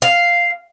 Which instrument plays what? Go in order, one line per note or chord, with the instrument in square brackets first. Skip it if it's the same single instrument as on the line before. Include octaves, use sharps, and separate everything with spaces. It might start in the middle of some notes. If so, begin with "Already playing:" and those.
[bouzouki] F5